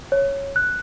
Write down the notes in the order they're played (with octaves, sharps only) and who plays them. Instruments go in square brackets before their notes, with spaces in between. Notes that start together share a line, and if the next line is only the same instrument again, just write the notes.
[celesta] C#5
F#6